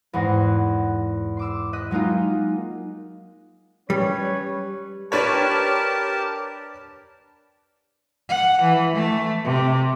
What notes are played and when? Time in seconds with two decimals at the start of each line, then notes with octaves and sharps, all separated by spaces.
0.13 E2 G#2 F#5 C6 A#6
1.37 C6 D6 E6
1.73 D#5 D#6 F#6 B6
1.91 F#3 G#3 A#3 D#4 F4
3.90 G3 C#4 B4 C#5
5.12 D4 G4 A#4 B4 C#5 A5
8.29 F#5
8.62 E3
8.96 A3
9.45 C3